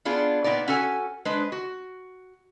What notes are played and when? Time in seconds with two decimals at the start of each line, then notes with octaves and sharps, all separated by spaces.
0.05 B3 D4 F4 G#4
0.44 A#2 B3 D#4 D5
0.68 C#4 F#4 A4 G#5
1.25 G#3 D4 B4 C5
1.52 F#4